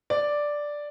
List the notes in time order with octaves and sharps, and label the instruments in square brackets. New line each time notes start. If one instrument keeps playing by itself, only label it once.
[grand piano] D5